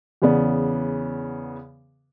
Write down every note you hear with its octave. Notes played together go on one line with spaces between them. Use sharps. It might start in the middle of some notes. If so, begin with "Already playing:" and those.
E2 C#3 B3 D5